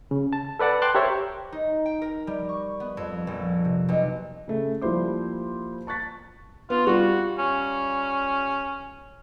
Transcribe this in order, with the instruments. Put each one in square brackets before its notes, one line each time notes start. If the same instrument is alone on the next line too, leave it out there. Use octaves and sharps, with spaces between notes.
[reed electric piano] C#3
A5
A4 B4 D5 F#5 A5
G5 A5 C6 D6 F#6
G4 A#4 C5 C#5 E5
[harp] D#4
G5
A#4
G3
C#6
B3
F2
A#1
C3
B1
[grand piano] C#3 A3
F3 G3 A#3 E4 C5 D6
A5 C#6 F#6 A6 B6
[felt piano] B3 [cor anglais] F4
[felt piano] G3 F4 [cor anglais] F#4
[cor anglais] C#4